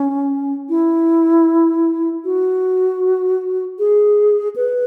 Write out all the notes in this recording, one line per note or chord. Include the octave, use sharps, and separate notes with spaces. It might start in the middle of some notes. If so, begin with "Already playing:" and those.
Already playing: C#4
E4
F#4
G#4
B4